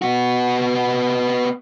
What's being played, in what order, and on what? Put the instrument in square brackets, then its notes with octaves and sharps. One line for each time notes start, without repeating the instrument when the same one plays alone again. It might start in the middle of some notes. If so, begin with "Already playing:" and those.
[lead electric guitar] B3 F#4